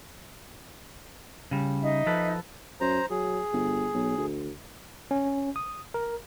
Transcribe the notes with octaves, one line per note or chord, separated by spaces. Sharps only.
C#3 G3
D#4 E5
F3 A4 B4
F#2 C5 A#5
F#3 G#4
G1
B1
D2
C#4
D#6
A#4